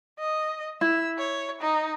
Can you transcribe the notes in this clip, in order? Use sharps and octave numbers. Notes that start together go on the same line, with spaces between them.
D#5
E4 E6
C#5
D#4